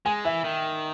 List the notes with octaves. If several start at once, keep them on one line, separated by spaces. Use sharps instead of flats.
G#3 G#5
E3 E5
D#3